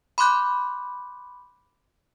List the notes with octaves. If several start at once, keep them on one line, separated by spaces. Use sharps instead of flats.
B5 C6 D6 F#6 G6